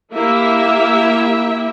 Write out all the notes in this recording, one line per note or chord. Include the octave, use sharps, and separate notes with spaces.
A#3 E4 G4 E5